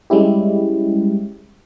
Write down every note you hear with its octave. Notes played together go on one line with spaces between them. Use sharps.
G3 G#3 C#4 E4 G4